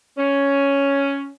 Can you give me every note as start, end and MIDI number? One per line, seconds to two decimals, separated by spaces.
0.18 1.30 61